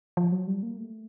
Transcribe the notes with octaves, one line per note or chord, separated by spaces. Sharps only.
F3
F#3
G3
A#3
A3